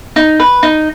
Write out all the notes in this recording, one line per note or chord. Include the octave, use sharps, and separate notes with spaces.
D#4
B4
D#4